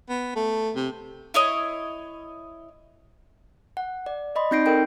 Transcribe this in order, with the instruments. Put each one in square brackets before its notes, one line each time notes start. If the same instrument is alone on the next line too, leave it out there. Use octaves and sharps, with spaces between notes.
[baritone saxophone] B3
A3
C3
[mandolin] E4 C#5 D#5
[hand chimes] F#5
D5
D5 D#5 B5 C6
C4 D#4 G6 A#6 C7 D7
A4 A#4 G5 D7